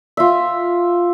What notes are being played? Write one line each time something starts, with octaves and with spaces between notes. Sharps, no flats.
F4 E5